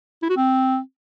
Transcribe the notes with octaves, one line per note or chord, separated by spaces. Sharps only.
E4
F#4
C4